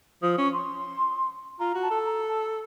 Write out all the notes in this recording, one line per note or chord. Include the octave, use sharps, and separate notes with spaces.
F3 D#6
C#4 C#6
C6
F4 A#5
F#4
A5
A4
A#5
A5